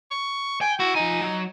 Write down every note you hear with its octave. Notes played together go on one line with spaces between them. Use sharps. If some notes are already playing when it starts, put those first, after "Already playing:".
C#6
G5 G#5
E4 F#4
F3 D#4 G#5
F#3